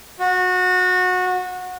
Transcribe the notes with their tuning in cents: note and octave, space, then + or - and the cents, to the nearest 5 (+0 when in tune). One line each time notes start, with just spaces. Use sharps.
F#4 -20